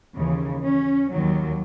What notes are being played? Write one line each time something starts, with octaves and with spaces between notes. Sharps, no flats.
D#2 C#3 E3
C#4
D#2 D#3 F#3